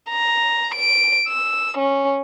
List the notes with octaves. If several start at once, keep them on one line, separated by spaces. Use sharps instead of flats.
A#5
D7
E6
C#4